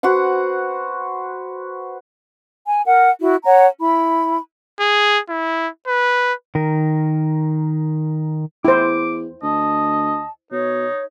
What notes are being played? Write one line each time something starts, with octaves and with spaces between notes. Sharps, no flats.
F#4 B4 C5 F#5
G#5
A#4 F#5
E4 F#4
C#5 F#5 A#5
E4 B5
G#4
E4
B4
D#3 A#4
E2 E4 C5 D6
D2 D#5 A5
B2 D#4 C#5